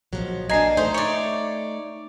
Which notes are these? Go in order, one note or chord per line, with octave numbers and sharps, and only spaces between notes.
A#1 B2 F3 F#3
A#3 D4 D#5 G#5 A#5 C7
A3 D#4 C5
C#5 D5 C#7